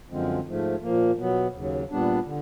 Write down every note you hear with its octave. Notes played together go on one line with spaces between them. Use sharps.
F#2 D3 F3 G#3 C4
G#2 F3 A3
A#2 F3 A#3
B2 F#3 B3
D#2 C#3 F#3
A#2 G3 B3 D4
D3